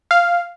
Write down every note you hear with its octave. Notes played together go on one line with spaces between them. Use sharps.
F5